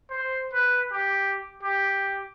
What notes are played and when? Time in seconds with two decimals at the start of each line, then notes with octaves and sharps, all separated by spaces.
0.10 C5
0.53 B4
0.92 G4
1.63 G4